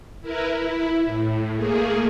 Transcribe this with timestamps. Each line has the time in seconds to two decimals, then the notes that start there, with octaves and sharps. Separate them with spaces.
0.21 E4 A#4 B4
0.57 E4
1.04 A2
1.55 A3 A#3 G#4